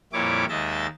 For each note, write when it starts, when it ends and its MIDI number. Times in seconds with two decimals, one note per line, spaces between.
0.13 0.45 41
0.13 0.45 46
0.13 0.45 55
0.13 0.45 64
0.13 0.45 73
0.13 0.45 86
0.49 0.87 39
0.49 0.87 56
0.49 0.87 75
0.49 0.87 76
0.49 0.87 93